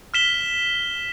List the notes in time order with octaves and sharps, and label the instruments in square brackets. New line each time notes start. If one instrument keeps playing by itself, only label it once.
[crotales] F6 B6 E7 G7